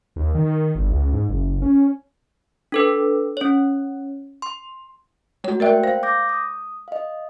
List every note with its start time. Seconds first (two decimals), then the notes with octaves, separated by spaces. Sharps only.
0.16 D#2
0.35 D#3
0.75 G1
0.90 C#2
1.13 G#2
1.29 F#1
1.62 C#4
2.72 D4 A4 B4
3.37 C#4 C#5
4.42 C6
5.44 G#3 A3 F#4 C#5
5.60 A#3 A#4 D5 E5 G5 F#6
5.84 C5 F5
6.03 D6 G6 A#6
6.29 D#6
6.88 D#5 F5